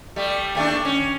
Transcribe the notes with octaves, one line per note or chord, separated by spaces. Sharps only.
G3 A3
D#2 A3 D4
C#4